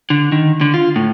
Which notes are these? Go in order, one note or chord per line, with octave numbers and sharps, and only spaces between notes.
D3
D#3
D3
F4
A2